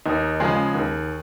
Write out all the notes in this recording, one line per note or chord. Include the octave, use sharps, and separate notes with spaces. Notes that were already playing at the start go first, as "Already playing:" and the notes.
D#2 D#4
C#3 F3 G#3 G#4
D#2